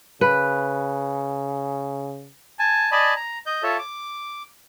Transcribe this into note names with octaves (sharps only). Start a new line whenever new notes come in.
C#3 B4
G#5 A5
D5 D#5 G#5 A5 B5
A#5
D#5 G6
F4 A4 C#5 E5 A5
D6